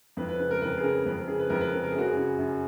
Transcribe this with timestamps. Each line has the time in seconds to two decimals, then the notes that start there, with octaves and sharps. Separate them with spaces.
0.17 F2 B4
0.28 B4
0.39 C#3 B4
0.51 A#4
0.62 F2 B4
0.78 G#4
0.83 C#3 A#4
1.06 F2 B4
1.17 A#4
1.28 C#3 G#4
1.39 B4
1.50 F2 A#4
1.61 B4
1.73 C#3 A#4
1.84 A#4
1.91 G#4
1.95 F#2 F#4
2.07 G#4
2.17 C#3
2.39 F#2